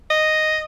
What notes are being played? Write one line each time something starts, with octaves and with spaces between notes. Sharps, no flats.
D#5